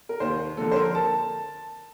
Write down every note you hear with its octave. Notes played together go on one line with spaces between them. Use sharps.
A#4
D#2 C5
D3 F3 A#3 A4
C5
A#4
A5